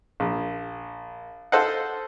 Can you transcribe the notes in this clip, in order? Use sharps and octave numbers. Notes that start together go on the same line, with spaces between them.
A#1
A4 C5 D#5 F5 F#5